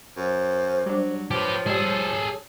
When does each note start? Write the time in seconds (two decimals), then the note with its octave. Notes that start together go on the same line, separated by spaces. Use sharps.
0.17 F#2 C5
0.86 F#3 G3 D4
1.31 F3 G4 B4 C#5
1.66 G#2 G3 G#4 A4